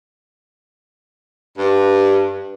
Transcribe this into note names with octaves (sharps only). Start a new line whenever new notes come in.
G2